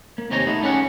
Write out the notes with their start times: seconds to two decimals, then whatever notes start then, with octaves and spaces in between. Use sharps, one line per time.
0.18 A#3
0.31 D#2 C3 D#4 C#5 G#5 A#5
0.47 A3 B3 D#4
0.63 G3 C#4 G#4 F#5